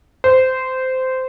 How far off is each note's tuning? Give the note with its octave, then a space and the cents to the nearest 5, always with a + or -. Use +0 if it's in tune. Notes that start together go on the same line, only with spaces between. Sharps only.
C5 -15